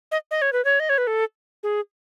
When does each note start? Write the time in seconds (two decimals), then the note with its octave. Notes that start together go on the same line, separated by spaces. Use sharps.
0.12 D#5
0.31 D#5
0.42 C#5
0.53 B4
0.65 C#5
0.80 D#5
0.89 C#5
0.98 B4
1.07 A4
1.63 G#4